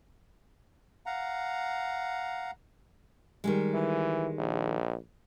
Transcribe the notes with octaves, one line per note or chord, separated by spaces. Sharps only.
F5 F#5 A#5
D#3 G3 G#3
E3
A#1